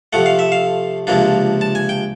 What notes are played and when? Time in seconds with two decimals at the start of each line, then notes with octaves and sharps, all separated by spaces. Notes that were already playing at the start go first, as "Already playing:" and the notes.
0.13 C3 F3 A3 F#5
0.26 F5
0.39 E5
0.52 F5
1.07 C#2 C3 F3 A#3 D4
1.61 A5
1.75 G#5
1.89 G5